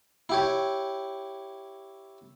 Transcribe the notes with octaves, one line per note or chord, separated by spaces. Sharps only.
E4 G4 C#5